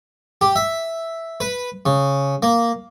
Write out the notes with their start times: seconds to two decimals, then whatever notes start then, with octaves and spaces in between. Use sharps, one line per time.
0.41 G4
0.56 E5
1.40 B4
1.86 C#3
2.43 A#3